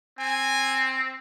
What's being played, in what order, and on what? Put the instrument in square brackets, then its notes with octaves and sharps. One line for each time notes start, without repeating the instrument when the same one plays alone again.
[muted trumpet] C4 [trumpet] G#5